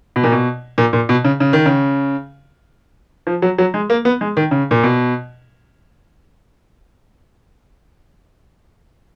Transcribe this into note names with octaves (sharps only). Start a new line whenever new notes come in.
B2
A#2
B2
A#2
A#2
B2
C#3
C#3
D#3
C#3
F3
F#3
F#3
G#3
A#3
B3
G#3
D#3
C#3
A#2
B2